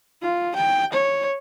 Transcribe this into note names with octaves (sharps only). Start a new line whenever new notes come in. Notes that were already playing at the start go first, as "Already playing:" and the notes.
F4
G5
C#5